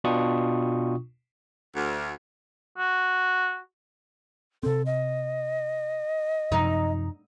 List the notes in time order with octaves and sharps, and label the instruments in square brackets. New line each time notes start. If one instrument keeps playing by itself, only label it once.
[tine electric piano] B2 D4 F4 G5 C#6 D#6
[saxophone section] D2
[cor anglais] F#4
[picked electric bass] C3 C4 [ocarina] A4
[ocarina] D#5
[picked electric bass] F#2 C3 F3 [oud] D#4